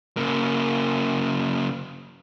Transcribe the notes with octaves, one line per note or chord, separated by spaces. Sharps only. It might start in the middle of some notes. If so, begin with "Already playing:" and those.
C#3 A#3